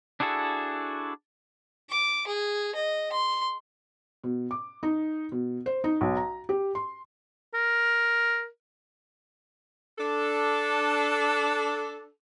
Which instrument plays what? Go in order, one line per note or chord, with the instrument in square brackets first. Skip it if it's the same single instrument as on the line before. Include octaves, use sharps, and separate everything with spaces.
[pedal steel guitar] D4 E4 F#4 G#4 A4
[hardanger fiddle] D6
G#4
D#5
C6
[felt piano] B2
D6
D#4
B2
C5
D#4
B1
A#5
G4
C6
[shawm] A#4
[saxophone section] D4 A4